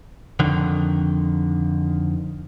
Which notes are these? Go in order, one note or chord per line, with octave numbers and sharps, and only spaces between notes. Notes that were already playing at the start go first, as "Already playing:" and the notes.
F2 D3 D#3